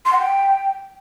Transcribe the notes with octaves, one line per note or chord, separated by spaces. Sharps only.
C6
F#5
G5